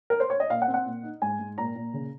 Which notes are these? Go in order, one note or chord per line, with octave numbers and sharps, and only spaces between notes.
A#4
C5
C#5
D#5
A#2 F5
F#5
C4
F#5
A#2
D#4
G#2 G#5
G#2
A#2 A#5
A#2
C#3